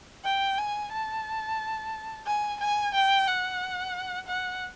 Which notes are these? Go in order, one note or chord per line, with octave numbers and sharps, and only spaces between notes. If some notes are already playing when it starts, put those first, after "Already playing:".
G5
G#5
A5
G#5
G#5
G5
F#5
F#5